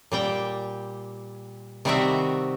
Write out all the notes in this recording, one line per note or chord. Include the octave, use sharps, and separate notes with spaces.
A#2 G3 G5
C3 D#3 G3 C4 F#4 E5